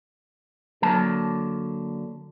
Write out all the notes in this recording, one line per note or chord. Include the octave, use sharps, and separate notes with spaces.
D3 F#3 A#3 A5